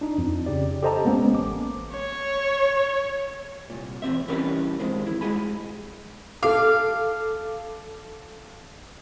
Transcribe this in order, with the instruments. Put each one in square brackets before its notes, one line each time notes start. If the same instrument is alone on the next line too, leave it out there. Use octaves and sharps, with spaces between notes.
[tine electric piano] D4 D#4
F2
C#3 G4 D5
G4 A4 C5 D#5 A5 A#5
G#3 A#3 B3 C#4
A1 D6
[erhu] C#5
[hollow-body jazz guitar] C2 A#2
E2 G2 C4 E5
E3 G3 C#4 A#4 B4
F2 D#3 G#3 C4
E4
G2 G#3 C#4 G#4 G#5 B5
[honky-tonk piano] A4 D6 [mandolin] F5